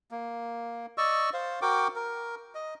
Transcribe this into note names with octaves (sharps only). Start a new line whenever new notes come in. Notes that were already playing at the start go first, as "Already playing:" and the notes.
A#3
D5 D#5 C#6 E6
C5 F5
F#4 A#4 G5 D6
A#4
D#5